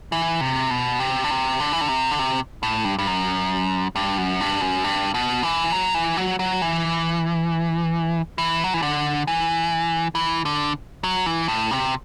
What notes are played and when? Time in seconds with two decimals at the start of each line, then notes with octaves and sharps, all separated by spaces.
0.12 E3
0.41 C3
0.70 B2
1.00 C3
1.24 D3
1.31 C3
1.60 D3
1.73 E3
1.81 D3
1.89 C3
2.11 D3
2.19 C3
2.63 A2
2.85 G2
2.98 G2
3.07 F#2
3.95 G2
4.18 F#2
4.40 G2
4.61 F#2
4.84 G2
5.14 B2
5.43 E3
5.72 F#3
5.94 E3
6.17 F#3
6.39 F#3
6.62 E3
8.38 E3
8.64 F#3
8.74 E3
8.82 D3
9.27 E3
10.15 E3
10.45 D3
11.04 F#3
11.26 E3
11.48 A2
11.71 C3